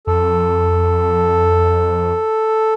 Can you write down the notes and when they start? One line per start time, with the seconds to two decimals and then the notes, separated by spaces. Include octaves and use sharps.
0.07 F2 A4